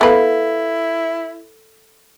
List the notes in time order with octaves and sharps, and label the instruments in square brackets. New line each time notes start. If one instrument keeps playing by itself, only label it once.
[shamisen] B3 B4 [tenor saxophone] E4 [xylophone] A4 F5